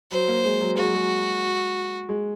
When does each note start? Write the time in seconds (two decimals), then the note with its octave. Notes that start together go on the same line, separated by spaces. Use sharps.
0.11 F#3 C5
0.28 A#3
0.45 G#3
0.61 F#3
0.77 G#3 F#4
0.86 F#3
0.95 G#3
2.09 G#3